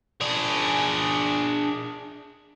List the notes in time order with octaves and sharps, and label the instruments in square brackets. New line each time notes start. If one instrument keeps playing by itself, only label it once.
[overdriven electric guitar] D4 G#4